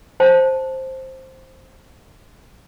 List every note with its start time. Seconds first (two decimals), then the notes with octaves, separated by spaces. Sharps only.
0.20 C5 A5